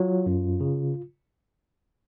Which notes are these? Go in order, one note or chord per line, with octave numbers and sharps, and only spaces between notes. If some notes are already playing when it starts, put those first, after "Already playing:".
Already playing: F#3 F4
F#2
C#3